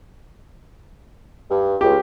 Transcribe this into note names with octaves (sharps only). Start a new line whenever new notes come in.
G2
C#2 G4